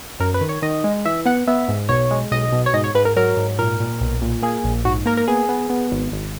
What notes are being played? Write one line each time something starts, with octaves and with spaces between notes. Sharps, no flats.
F#2 A#4
B4
D#3
C#5
D#3 D#5
G#3
E3 E5
B3 F#5
B3 E5
G#2
B1 C#5
G#3
B1 D#5
B2
C#5
G#2 D#5
C#5
G#2 B4
A#4
F#3 A#4
G#2
A#2 A#4
A#2
B1
A#2
A#3 G#4
A#1
G#2 F#4
A#3 A#4
A#4
B3 G#4
B3
B3
G#1
G#1